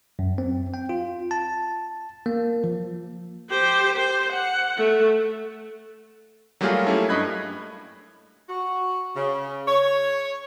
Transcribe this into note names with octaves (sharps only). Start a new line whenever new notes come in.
F#2
C4
G5
F4
A5
A#3
F3
G4 C5
C5
F#5
A3
F#3 G3 A3 A#3 F4 G#4
A3 A#3 C#4 E4 A4
G2 D#5 B5 F#6 G#6
F#4
C#3
C#5